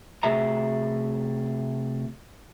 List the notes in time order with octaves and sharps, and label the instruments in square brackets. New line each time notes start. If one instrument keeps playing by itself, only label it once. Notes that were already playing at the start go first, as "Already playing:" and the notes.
[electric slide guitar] C3 A3 F#4 G#4 E5 A#5